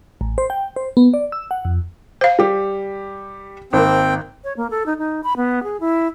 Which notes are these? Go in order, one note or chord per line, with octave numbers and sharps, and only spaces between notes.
A1
C5
G5
C5
B3
D5
E6
F#5
F2
C5 F5
G3 G4
G#1 A#3 C4 G5
C#5
A#3
A4
D#4
D#4
B5
B3
G#4
E4